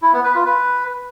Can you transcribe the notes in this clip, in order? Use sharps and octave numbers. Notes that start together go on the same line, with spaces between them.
E4
B3
B4
F4
B4